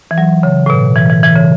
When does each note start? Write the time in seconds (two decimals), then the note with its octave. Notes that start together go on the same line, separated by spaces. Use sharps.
0.11 E3
0.18 F#3
0.43 C#3
0.66 A2
0.70 B2
0.96 E3
1.10 E3
1.23 E3
1.36 C#3